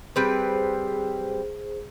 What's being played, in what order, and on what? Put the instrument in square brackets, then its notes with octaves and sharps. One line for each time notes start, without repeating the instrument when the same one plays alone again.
[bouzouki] G3 C4 B4 [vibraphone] G#4 C5